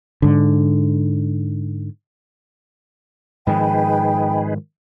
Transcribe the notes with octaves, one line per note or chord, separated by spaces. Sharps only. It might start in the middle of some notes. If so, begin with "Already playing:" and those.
G#2 D3
G#2 D#3 F3 D#4 G#4 B4 G5